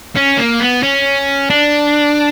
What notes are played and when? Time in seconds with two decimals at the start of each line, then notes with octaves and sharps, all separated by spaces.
0.16 C#4
0.37 A#3
0.60 B3
0.83 C#4
1.50 D4